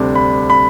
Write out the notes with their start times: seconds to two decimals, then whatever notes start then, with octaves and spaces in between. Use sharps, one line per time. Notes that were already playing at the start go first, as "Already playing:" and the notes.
Already playing: D2 C3 G3 D4
0.15 B5
0.50 B5